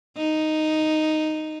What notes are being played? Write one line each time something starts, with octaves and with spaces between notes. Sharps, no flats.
D#4